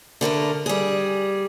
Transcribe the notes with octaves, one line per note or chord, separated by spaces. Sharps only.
D3 A3 A#4 B4
G3 G#4